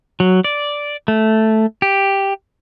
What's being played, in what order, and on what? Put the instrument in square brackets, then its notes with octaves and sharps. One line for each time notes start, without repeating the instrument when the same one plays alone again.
[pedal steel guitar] F#3
D5
A3
G4